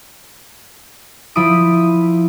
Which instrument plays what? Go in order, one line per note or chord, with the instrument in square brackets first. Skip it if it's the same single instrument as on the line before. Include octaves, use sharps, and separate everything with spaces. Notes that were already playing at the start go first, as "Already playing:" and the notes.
[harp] F3 E4 B5 D#6 D7